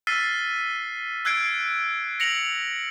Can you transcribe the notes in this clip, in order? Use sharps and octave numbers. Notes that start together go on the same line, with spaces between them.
E6 F6 A6 B6 C7 D#7
E6 F#6 G#6 C7 D7
A#6 C#7 F7 F#7